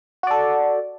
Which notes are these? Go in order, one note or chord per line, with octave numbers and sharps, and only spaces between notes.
F#4 A4 D5